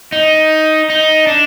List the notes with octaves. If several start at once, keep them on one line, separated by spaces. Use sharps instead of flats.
D#4
D#4
D4